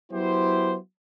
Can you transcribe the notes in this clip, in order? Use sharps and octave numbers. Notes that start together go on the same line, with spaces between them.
F#3 B3 E4 G4 C5